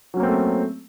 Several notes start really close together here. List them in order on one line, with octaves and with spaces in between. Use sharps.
F#3 C#4 A#3 C4 A3